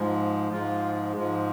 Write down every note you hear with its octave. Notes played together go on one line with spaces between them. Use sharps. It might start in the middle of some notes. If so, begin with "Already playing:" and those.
Already playing: G#2 F3 G#3
G#2 F3 G#3 F4
G#2 F3 G#3